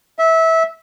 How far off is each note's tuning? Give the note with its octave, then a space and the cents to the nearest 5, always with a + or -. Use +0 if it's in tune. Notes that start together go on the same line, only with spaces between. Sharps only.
E5 -20